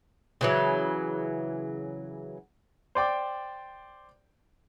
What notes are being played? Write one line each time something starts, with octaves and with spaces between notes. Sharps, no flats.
C#3 E3 F#3
C5 D5 G5 D6